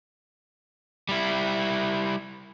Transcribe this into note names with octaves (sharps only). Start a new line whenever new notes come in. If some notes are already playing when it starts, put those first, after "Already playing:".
G3 E4